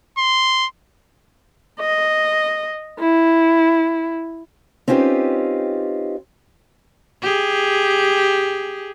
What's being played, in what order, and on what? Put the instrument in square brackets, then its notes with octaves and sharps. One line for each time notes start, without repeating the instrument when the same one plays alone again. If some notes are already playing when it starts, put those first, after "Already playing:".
[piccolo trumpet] C6
[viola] D#5
E4
[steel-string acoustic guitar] C4 C#4 D#4 F4 G4 B4
[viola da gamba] G4 G#4